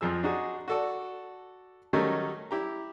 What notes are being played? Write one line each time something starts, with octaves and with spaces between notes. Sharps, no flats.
F2 F3 G#4 E6
D4 D#4 F#4 G#4
F#4 A4 D5
D#3 F#3 G3 A3 C#4 D#4
E4 G4 A#5